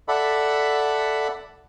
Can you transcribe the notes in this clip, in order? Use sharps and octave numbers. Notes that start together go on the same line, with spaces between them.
A4 D5 E5 F#5 B5